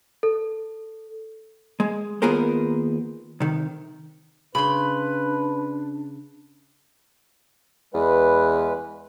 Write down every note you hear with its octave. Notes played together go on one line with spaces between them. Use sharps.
A4
G#3
D#2 B3 F4 G#4 A#4 C5
C3 D#3
C#3 D4 B4 B5 C6
E2 G#3 B4